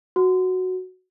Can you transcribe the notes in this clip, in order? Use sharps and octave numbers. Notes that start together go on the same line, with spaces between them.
F#4